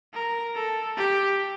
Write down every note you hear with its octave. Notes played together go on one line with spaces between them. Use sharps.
A#4
A4
G4